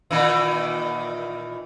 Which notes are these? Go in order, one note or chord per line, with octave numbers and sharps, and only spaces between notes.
A#2 D#3 E3